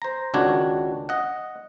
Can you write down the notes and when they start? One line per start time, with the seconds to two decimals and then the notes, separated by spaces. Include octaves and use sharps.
0.02 C5 A#5
0.34 C#2 D#3 D4 F#4 C#5
1.09 D#5 F#5